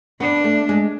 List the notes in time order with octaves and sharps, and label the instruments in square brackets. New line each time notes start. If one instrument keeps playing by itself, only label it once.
[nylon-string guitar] B3 [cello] D4
[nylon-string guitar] A3
G#3